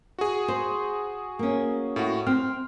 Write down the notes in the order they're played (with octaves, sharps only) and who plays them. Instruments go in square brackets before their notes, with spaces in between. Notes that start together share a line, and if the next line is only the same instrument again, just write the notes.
[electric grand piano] F#4 G#4
[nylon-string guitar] C5
A#3 C#4
[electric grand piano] A2 F#4
[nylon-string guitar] C4 [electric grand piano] F6